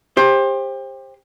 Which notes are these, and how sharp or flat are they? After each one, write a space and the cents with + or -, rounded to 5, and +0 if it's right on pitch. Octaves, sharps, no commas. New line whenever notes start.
G4 +25 C5 +25